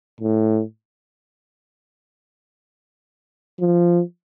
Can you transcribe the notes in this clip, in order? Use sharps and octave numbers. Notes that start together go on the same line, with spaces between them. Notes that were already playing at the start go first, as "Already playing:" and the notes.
A2
F3